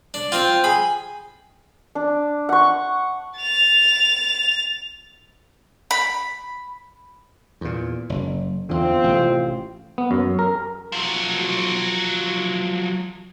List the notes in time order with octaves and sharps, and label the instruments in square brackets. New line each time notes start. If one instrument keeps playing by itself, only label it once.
[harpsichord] D4
[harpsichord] C4 F4 [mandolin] G5
[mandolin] G#4 [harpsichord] B5
[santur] D4
F#5 C#6
[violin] A6 F7
[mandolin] B5
[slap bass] E2 A#2
F#1
[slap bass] E2 D3 [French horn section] C4 F4
[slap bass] A1 A2 C3
[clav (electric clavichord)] B3
F#2
A#4
[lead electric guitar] F3 F#3